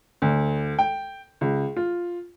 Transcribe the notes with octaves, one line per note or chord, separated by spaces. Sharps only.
D2
G5
C#2
F4